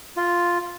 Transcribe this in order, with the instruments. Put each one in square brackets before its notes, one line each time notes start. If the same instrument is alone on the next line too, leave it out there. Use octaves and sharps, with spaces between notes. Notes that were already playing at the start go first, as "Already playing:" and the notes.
[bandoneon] F4